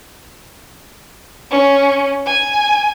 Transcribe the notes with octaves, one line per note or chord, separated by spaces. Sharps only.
C#4
G#5